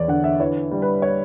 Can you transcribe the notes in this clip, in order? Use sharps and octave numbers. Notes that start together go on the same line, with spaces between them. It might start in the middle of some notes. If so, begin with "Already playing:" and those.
Already playing: E2 B3 C#5 D5
D3 F#5
E5
E3 C#5
G3
B4
C#5